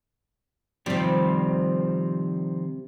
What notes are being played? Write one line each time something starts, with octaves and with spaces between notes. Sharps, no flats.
C3 D#3 F3 G3 C4